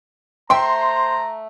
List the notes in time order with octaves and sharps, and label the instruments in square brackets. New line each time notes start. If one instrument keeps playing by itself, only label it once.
[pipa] A3 E5 G5 [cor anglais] C5 [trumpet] A#5 [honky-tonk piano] C6